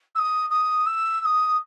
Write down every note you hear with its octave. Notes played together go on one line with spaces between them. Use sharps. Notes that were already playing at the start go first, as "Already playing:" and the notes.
E6
D#6
D#6
E6
E6
D#6